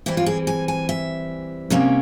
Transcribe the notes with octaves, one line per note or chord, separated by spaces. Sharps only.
E3 G3 C4 E4
F4
G#4
G#5
G#5
E5
C3 G3 A#3 C#4